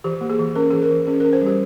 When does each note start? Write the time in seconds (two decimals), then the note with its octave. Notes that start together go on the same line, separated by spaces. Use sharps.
0.04 E3 G4
0.21 A#3
0.30 G#4
0.39 E3
0.55 C#4 A#4
0.71 E3 G#4
0.82 A#4
0.91 E3
1.07 C#4 G#4
1.20 A#4
1.25 C#4
1.33 C5
1.42 G3 G4